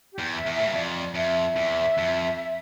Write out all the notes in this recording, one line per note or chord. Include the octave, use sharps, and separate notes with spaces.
G4
E2
E5
E2
E5
A2
G2
F2 D5
F2 E5
E2
F2